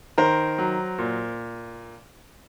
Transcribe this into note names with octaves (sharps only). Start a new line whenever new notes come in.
D#3 A#4 C5
F#3
A#2